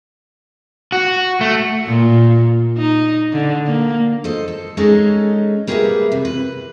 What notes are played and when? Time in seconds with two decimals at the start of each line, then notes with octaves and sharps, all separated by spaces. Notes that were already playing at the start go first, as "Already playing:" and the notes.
0.92 F#4
1.41 A3
1.85 A#2
2.78 D#4
3.33 D3
3.66 A#3
4.24 A4 C5 D#5
4.48 A4
4.77 G#3 C#4 D#4 G#4 A4
5.67 G3 A#3 G#4 A#4 B4 E5
6.12 C3
6.25 B4